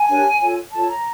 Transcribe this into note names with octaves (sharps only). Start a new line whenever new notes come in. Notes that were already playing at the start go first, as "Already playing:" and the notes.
Already playing: G#5
D4 G4 A#4 C#5
F4 A4 C#5
F4 A4 C#5 A5
A#5